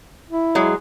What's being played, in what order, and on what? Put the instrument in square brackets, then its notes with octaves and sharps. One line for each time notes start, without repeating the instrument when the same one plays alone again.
[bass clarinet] E4
[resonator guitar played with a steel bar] F#3 G#3